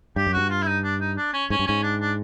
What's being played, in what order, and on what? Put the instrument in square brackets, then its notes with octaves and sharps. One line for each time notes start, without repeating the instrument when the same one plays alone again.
[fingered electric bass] G2 [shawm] G4
[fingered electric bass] F#2
[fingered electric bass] G2 [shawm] F#4
[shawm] F4
E4
D#4
D4
D#4
D4
C#4
[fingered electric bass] G#2 [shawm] C#4
[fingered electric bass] G2
[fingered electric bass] G#2 [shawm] C#4
[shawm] D4
D4